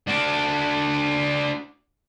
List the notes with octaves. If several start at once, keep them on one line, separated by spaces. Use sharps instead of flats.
D4 F#4